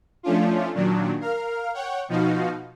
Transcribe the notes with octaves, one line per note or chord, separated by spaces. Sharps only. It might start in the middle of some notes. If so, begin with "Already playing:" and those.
F3 A3 C#4 D4 F4
A#2 D#3 F#3 D4
A#4 F5 F6
C#5 F#5 G5
B2 F3 D#4 F#4 F5